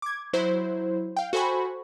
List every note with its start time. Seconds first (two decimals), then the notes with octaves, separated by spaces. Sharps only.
0.02 D6 G#6
0.33 F#3 E4 C5
1.16 F5 G5
1.33 F#4 A4 C5 G#5 B5 C#6